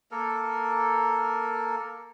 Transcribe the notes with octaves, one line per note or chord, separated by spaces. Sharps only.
A#3 A4 A#4